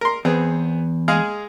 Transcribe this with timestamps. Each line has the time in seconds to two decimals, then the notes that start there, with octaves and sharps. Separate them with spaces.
0.01 A#4 C6
0.25 E2 B3 C4 G#4
1.08 G#3 G#4 F5